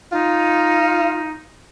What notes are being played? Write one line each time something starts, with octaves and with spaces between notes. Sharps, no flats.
D#4 F4